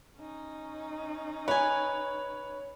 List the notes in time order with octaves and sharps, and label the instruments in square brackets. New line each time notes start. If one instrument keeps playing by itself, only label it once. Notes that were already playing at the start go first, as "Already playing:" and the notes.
[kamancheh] C#4 D#4
[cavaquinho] B4 G#5 [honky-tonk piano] C#5